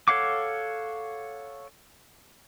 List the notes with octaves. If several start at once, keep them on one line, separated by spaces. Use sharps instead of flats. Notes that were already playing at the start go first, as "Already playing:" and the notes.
A4 C#5 F5 F#5 D6